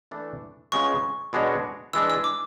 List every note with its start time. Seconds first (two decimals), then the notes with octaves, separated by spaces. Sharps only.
0.11 E3 A3 D4 A4
0.72 C#2 C#3 G#3 B3 C#6
1.33 B2 G#3 D4 F#4 C#5
1.93 E3 G#3 D4 E6
2.10 E6
2.24 D6